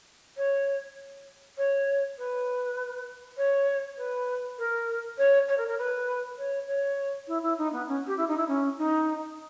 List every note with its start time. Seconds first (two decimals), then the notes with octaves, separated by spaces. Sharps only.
0.37 C#5
1.57 C#5
2.18 B4
3.37 C#5
3.97 B4
4.58 A#4
5.18 C#5
5.48 C#5
5.57 A#4
5.68 A#4
5.78 B4
6.38 C#5
6.67 C#5
7.27 E4
7.42 E4
7.58 D#4
7.72 B3
7.88 C#4
8.07 G4
8.17 E4
8.28 D#4
8.37 E4
8.48 C#4
8.78 D#4